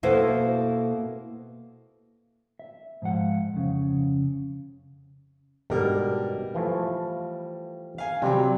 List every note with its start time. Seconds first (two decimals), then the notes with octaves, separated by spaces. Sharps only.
0.03 B2 A#3 E4 A4 C5
2.59 E5
3.02 G#2 F3 F5 F#5
3.54 F2 C#3
5.70 G#2 B2 G3 D4 A#4
6.54 E3 F3 A3
7.98 F5 G#5
8.22 C3 F#3 G3 C4